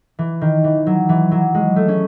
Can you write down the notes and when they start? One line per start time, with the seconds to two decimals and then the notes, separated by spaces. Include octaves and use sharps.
0.19 E3
0.41 D#3
0.64 E3
0.87 F#3
1.09 E3
1.31 F#3
1.54 G#3
1.76 A3
1.88 C#4